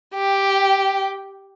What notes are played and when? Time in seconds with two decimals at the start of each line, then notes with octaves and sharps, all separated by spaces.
0.15 G4